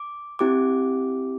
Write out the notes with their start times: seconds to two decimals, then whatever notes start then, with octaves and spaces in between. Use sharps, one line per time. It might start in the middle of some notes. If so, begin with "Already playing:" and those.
Already playing: D6
0.39 C4 E4 G4 D6